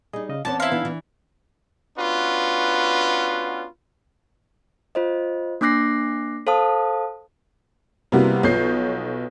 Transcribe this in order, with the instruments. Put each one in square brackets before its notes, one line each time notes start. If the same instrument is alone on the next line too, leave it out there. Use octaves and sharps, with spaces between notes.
[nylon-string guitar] G3 D#4 [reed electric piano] G#4 D#5
[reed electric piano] C#3 D#5 F5
[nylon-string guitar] E2 C4 C#4 [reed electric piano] F#5 D6 [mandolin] A5
[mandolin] E4 F5 [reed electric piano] C5 A#5 C6
[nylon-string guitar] E3 D4 D#4 [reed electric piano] B3
[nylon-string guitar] E3
[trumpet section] B3 C#4 D4 F4 F#4 B4
[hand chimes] F4 C5 D#5
A#3 D4 D6 F#6 A#6 C7
A4 C5 F5 A5 D#6
[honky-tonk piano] C3 G3 A#3 B3 E4 F#4
B1 F3 B3 C#5 G6 C7